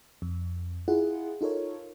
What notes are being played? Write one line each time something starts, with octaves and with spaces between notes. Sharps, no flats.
F2
E4 F4 G#4 F#5
D#4 F4 A4 A#4 C#5